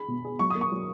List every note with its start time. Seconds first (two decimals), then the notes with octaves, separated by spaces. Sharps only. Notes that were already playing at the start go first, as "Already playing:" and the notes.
Already playing: G#4 B5
0.08 B2
0.25 G#4
0.39 F#3 C#6
0.50 A#3 D#6
0.61 C#6
0.72 F#3